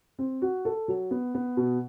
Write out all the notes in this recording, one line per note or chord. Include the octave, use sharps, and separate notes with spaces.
C4
F#4
A4
F#3
B3
B3
B2